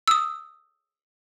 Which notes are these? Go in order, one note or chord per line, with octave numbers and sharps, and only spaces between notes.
D#6 E6